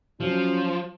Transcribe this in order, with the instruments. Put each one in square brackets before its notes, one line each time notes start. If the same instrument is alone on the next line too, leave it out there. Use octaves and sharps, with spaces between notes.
[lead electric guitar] F3 [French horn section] F#3 C#4